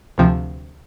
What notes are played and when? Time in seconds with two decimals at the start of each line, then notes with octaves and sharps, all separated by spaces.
0.18 D2 C3 F3